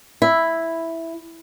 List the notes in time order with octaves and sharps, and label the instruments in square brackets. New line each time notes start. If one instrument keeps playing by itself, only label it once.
[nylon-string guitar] E4